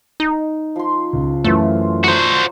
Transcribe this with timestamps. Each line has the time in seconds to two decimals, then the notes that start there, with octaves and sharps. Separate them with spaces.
0.20 D#4
0.76 F3 C6
1.13 C#2
1.44 F#2 E3 A3 F4
2.04 F#4 C5 A#5 D#6